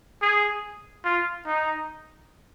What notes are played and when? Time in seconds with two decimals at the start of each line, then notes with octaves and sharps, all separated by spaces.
0.22 G#4
1.05 F4
1.46 D#4